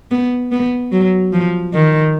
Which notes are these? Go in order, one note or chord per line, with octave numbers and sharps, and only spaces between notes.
B3
B3
F#3
F3
D#3